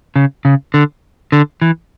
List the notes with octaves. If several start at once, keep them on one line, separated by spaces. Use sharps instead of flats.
C#3
C#3
D3
D3
E3